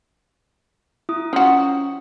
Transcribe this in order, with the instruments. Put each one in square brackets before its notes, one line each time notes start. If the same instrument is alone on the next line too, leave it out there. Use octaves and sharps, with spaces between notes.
[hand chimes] E4 D#6
[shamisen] F3 F#4 [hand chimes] C#4